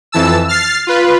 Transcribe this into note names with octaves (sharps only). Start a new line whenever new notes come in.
F2 E3 A5 E6
F6 A6 C7
F4 B4